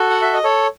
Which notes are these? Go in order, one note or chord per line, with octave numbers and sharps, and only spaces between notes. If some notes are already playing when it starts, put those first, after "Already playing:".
Already playing: F#4 A4
F#5
E5
D#5
A4 C#5